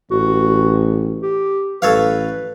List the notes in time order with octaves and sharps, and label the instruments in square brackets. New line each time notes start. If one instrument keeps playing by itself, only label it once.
[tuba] A1 [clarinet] F#4
[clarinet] G4
[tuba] A1 [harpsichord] A4 C#5 F5 [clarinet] B4